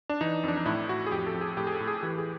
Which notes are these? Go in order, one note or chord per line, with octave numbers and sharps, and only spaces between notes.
D4
E3 D#4
F2 D4
D#4
A2 E4
A2 F#4
G#4
F2 G4
A4
F2
G#4
A2 G4
G#4
A4
A2
G#4
E3 G4
G#4